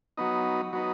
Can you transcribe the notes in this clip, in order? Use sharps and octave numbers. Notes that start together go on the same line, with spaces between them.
F#3 B3 D#4
F#3 B3 D#4